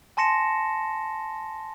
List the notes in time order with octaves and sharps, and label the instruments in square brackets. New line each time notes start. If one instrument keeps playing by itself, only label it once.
[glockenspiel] G#5 A5 C6 A#6 C#7 E7